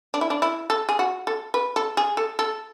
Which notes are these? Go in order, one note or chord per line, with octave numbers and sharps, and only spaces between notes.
D4
E4
D4
E4
A4
G#4
F#4
A4
B4
A4
G#4
A4
A4